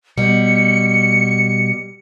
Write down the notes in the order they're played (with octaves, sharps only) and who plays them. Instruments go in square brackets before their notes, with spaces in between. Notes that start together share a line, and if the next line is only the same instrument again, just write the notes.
[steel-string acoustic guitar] B2 G3 [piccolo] C#7